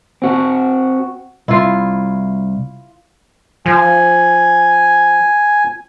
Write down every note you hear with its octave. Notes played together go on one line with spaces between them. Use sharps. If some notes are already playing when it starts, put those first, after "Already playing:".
C4 F#4
C2 E4 F4
F3 G#5